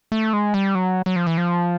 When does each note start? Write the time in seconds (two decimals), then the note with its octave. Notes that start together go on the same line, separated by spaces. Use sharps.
0.12 A3
0.33 G#3
0.54 G3
0.75 F#3
1.06 F#3
1.16 F3
1.27 E3
1.38 F3